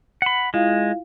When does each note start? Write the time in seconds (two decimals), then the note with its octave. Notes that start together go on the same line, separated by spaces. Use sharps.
0.22 F#5 B5
0.54 G#3 E4 F4 F5